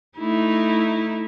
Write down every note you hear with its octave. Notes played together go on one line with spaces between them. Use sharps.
A3 D#4 E4